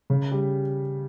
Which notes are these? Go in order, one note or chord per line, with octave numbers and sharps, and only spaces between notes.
C#3
G3